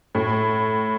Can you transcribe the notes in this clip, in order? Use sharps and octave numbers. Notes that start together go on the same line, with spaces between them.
A2